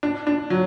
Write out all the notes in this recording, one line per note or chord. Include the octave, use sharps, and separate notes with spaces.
D4
D4
F#3